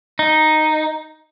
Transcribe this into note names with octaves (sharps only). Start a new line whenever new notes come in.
D#4